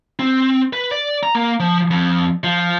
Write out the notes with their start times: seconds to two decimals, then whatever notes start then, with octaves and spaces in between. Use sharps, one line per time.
0.19 C4
0.73 B4
0.91 D5
1.23 A#5
1.35 A#3
1.60 F3
1.91 F2
2.44 F3